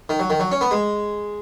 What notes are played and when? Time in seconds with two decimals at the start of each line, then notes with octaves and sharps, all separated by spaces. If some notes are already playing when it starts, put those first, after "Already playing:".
0.09 D#3
0.19 F#3
0.30 D#3
0.40 F#3
0.51 C#4
0.61 B3
0.71 G#3